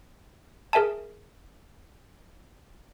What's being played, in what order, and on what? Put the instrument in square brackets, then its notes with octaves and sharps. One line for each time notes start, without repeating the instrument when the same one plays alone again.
[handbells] G#4 A#4 E5 G#5 A5